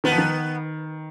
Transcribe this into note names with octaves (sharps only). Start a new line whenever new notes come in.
D#3 B3
F3
D#3